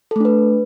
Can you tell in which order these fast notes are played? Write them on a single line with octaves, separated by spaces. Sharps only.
A4 A3 D4 B4